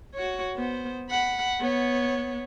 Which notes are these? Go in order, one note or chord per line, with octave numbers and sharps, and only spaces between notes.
F#4 C#5
B3 C5
F#5 B5
B3 C#5